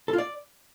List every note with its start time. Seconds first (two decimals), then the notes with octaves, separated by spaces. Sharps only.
0.08 A4
0.13 F4
0.18 D5